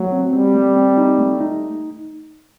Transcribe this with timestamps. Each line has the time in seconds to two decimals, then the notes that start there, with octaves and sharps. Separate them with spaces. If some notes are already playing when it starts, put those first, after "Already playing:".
Already playing: F#3 A3
0.12 C4
0.33 G3 C4
0.54 A3
0.76 C4
0.97 D#4
1.19 A3
1.40 D#4